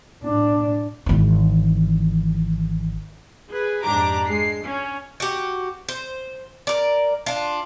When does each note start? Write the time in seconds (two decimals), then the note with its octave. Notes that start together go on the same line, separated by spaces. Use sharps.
0.23 A2 D4
1.06 G#1 E3
3.47 G#4 B4
3.82 F2 G#2 D4 G4 A#5 D6
4.25 G#3 C7
4.64 C#4
5.20 F#4 G4
5.89 C5
6.67 A#4 D5
7.26 D4 F4